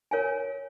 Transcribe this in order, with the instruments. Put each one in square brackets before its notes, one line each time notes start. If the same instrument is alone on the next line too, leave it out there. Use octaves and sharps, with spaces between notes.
[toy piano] A#4 C#5 F5 G#5